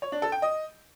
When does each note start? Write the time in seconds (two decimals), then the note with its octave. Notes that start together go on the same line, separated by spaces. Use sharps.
0.02 C#5
0.12 D4
0.22 A4
0.32 G5
0.42 D#5